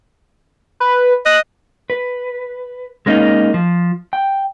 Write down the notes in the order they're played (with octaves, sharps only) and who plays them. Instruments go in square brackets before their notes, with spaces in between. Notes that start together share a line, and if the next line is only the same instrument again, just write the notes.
[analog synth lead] B4
[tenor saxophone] D#5 [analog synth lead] F#6
[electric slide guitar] B4
G#3 A#3 C#4 D#4
F3
G5